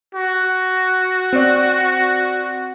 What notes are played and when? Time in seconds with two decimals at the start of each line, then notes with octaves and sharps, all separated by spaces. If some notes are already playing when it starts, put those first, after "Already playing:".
0.15 F#4
1.33 C4 D5